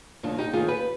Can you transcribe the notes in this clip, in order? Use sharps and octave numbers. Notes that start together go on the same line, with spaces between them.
D#2 D#3 D4 F4
D#4 G4
D#2 D#3 F4 G#4
G4 B4